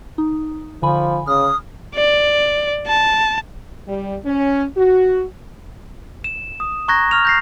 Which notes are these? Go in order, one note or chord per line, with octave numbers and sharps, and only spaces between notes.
D#4
D3 F3 G#5 B5
C#3 D#6 F6
D5
A5
G3
C#4
F#4
E7
D#6
A#5 C#6 F#6 G#6 A#6
C#6 F6 F7
G6 A#6 C7